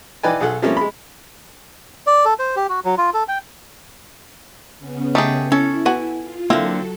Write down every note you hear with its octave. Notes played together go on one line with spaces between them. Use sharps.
E3 D#4 B4 D5 G5 G#5
B1 G#4 A4 F#5
F3 G3 A3 A#3 C4 C#4
G#3 B5
D5
A4
C5
G4
F#4
F#3
F4
A4
G5
C#3 B3 C#4
A3 D#4 G4 G#4
C#4 E4 A4
B3 F#4 G#5
F4
D3 F#3 A#3 C4 E4 A4 F5